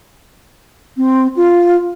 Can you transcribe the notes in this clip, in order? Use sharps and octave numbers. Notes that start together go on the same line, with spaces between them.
C4
F4